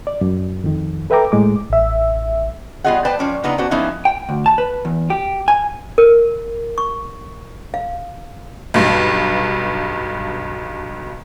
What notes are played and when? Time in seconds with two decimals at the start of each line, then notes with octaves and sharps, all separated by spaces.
0.07 D5
0.21 F#2
0.64 F2 D#3
1.10 A4 B4 E5 G5 A#5 D6
1.32 A2 G#3 D6
1.70 A1 E5
2.84 G3 B3 F4 G#4 D#5 F#5
3.05 B4 C5 D5 G5 A5
3.19 F3 C#4 D5
3.44 C#3 B3 D4 D#4 F4 A#5
3.58 B3 C#4 D4 F#4 C5
3.71 F3 G3 B3 C#4 D#4 E4
4.05 G5
4.29 D2
4.46 A5
4.58 B4
4.85 E2
5.10 G4
5.48 G#5
5.98 A#4
6.78 C#6
7.74 F5
8.74 B1 G2